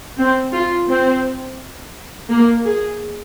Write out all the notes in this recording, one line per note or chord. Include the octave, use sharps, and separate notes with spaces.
C4
F4
C4
A#3
G#4